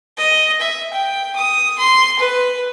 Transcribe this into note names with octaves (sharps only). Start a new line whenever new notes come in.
D#5
E5
G5
D#6
C6
B4